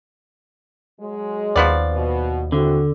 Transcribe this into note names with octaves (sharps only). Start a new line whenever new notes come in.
F#3 G#3
D#2 F3 B3 D5
B2
D3 C4 E4 F#4